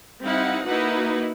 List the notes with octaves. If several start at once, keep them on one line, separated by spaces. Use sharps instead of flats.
G3 C4 D#4 E4 F5 F#5
A#3 D#4 E4 F#4 B4 F#5